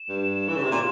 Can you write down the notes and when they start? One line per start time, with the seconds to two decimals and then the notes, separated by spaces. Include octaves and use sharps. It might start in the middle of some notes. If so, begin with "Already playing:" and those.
Already playing: E7
0.09 G2
0.48 E3
0.56 C#3
0.63 C3
0.71 A#2